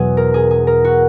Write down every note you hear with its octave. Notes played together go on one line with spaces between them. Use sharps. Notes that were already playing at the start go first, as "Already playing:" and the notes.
Already playing: E2 B2 F#3 F#4 G#4
A#4
G#4
G#4
A#4
F#4